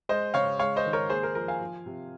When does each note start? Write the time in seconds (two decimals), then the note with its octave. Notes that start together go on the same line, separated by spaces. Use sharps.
0.09 G#3 C5 D#5
0.34 C#3 C#5 F5
0.59 G#3 C#5 F5
0.76 C5 D#5
0.85 D#3
0.93 A#4 C#5
1.10 A#3 G#4 C5
1.23 A#4
1.35 F3 A#4
1.48 F5 G#5
1.61 F3
1.86 C3